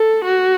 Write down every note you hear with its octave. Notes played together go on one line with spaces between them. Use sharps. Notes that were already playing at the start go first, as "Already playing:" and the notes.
Already playing: A4
F#4